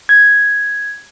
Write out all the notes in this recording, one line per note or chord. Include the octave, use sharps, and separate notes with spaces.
G#6